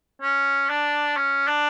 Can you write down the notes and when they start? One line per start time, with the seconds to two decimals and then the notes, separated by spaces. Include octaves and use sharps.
0.22 C#4
0.70 D4
1.16 C#4
1.48 D4